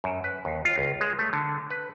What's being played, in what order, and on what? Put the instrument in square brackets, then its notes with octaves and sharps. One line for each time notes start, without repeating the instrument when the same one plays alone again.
[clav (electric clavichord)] F#2
B4
D#2
F4
C#2
G#3
A3
D3
B4